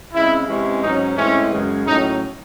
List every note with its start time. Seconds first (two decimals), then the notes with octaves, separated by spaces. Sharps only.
0.13 C#3 G#3 C4 E4
0.48 C3 E3 G#3 C#4
0.82 G#2 F#3 C#4 D#4
1.17 A2 E3 G#3 C4 C#4
1.52 F#2 C#3 G#3
1.86 A2 F#3 C#4 D#4